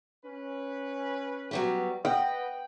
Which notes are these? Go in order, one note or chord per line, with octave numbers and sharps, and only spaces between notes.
C#4 B4
F#3 G3 B3
B4 D#5 F#5 G5